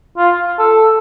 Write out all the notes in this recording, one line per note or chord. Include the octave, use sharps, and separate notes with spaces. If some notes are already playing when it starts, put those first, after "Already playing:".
F4
A4